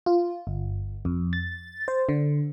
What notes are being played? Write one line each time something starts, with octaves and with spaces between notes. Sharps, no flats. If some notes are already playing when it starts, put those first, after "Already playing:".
F4
G1
F2
A6
C5
D3